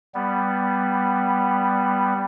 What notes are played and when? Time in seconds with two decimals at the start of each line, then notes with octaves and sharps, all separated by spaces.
0.14 G3 B3